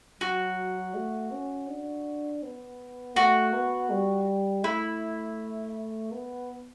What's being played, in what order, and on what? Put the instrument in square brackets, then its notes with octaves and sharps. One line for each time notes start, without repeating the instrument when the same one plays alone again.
[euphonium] F#3 [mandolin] F#4
[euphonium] A3
C#4
D4
B3
[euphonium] A3 [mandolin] F#4
[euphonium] B3
G3
[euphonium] A3 [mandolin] E4
[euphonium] B3